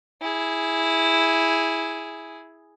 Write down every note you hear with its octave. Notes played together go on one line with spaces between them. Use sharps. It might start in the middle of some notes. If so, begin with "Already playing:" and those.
E4 G#4